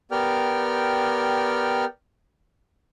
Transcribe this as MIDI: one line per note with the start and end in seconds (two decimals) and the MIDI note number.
0.11 1.85 59
0.11 1.85 67
0.11 1.85 70
0.11 1.85 74
0.11 1.85 79
0.11 1.85 89